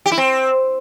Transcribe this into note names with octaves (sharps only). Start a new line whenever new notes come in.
G4
E4
C4